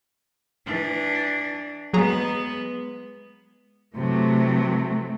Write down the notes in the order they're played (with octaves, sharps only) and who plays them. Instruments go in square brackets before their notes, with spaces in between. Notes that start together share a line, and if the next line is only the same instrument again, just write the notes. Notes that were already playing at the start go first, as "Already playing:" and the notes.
[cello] E3 D4
[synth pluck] F#3 G#4 A#5 [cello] G#3 B3
[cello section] C3 A3 [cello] E3 F#3